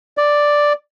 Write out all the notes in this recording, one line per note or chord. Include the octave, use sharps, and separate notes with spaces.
D5